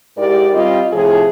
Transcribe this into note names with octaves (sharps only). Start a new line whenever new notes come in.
G#2 E4 G4 A#4 D5
G3 C4 F4 D#5
A2 C3 F3 G#4